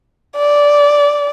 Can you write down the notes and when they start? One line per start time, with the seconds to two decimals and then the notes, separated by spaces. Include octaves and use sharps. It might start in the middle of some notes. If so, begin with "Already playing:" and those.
0.37 D5